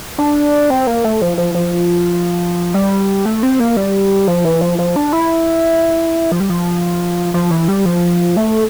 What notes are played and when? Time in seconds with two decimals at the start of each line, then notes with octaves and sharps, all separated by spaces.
0.18 D4
0.70 C4
0.87 A#3
1.04 A3
1.21 F3
1.38 F3
1.55 F3
2.74 G3
3.25 A3
3.43 C4
3.60 A#3
3.77 G3
4.27 F3
4.45 E3
4.61 F3
4.79 F3
4.96 D4
5.13 E4
6.32 F3
6.40 G3
6.50 F3
7.34 F3
7.51 E3
7.68 G3
7.85 F3
8.37 A3